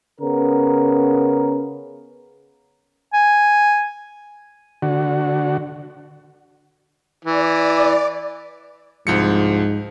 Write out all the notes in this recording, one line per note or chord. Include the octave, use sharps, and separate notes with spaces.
C#3 B3 A#4
G#5
D3 F#4
E3 D5
C2 G#2 F3 C#7